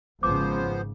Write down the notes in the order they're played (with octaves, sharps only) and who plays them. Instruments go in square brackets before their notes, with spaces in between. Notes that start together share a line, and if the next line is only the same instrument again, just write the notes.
[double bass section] G#1 G#2 C#3 [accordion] F3 B3 C5 [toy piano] D6